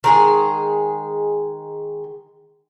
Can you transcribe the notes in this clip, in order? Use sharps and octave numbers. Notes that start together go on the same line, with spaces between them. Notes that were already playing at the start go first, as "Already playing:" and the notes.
D#3 G#3 G#4